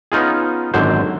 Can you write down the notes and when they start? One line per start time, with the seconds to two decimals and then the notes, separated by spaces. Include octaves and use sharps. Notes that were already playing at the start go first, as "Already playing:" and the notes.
0.12 B3 C#4 D#4 F4 G#4
0.74 G#1 F#2 D3 F#3 C5